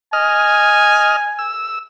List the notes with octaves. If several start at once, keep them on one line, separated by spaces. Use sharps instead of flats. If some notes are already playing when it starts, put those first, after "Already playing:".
D#5 G#5 F6
E6